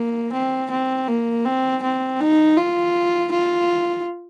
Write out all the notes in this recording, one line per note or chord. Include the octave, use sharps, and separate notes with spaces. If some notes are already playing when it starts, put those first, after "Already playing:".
Already playing: A#3
C4
C4
A#3
C4
C4
D#4
F4
F4